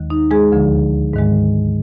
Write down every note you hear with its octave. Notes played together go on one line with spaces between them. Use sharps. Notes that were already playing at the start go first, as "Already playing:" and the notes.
Already playing: D#2 D#3 G#3
D#4
G#3 G#4
D2 D3 F3 G#3
G#2 D#3 G#3